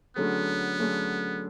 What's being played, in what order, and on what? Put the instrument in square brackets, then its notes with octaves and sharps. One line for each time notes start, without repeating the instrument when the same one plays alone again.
[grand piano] D3 F#3 A3 C#4 G#4 [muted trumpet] B3
[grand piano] D3 F#3 A3 C#4 G#4